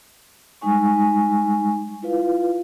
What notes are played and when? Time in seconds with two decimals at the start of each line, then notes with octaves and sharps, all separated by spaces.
0.61 G3 G#3 D#4 G#5 C#6
2.03 E4 F4 B4 F5